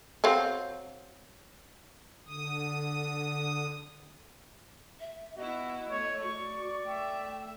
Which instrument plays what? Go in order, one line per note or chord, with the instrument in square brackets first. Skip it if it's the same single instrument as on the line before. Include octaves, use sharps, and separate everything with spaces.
[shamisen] F#3 C4 F5
[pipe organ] D3 D#6
[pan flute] E5
[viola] B3 E4 [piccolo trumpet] F#4 [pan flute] D#5
[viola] A3 [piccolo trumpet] C#5
[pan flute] F#4 [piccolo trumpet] D5 [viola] C#6
[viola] A3 E5 [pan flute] G5